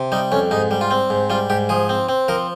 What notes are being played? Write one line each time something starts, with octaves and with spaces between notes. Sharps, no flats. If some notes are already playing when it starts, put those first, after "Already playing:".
Already playing: C3
G3 D#4
F2 C#4
G#2 D#4
G3
F4
C4
G#2
G3 F4
G#2 G4
F3 G#4
C4
C4
F3 A#4